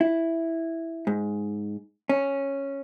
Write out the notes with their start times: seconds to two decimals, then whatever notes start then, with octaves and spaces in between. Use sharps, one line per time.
0.01 E4
1.07 G#2
2.09 C#4